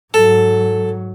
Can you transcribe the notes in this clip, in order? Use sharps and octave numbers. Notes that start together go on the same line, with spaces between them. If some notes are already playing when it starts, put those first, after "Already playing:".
G#2 F#3 A4